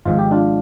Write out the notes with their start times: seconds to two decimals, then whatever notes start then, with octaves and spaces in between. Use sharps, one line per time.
0.05 G#1 G#2 F3 F4
0.19 G4
0.31 D4 F4